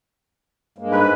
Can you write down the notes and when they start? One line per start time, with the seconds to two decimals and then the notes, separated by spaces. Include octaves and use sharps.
0.78 G2 G#3 A#3
0.92 G#2 B4